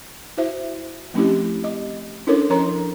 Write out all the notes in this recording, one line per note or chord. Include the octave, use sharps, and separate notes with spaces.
E4 F#4 C5 E5
F3 A3 C4 C#4 E4 G4
D#5
C#4 D4 E4 A4 A#4 C#5
F3 C#4 A#4 C#5 A#5 C6